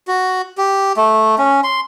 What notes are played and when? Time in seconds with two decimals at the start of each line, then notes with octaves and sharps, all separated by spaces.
0.08 F#4
0.58 G4
0.97 A3
1.38 C#4
1.64 C6